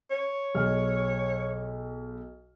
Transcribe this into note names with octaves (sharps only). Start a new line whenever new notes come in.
C#5
B1 G#4 F6